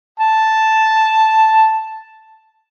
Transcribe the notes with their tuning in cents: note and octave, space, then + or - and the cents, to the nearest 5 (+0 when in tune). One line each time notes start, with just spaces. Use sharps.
A5 +0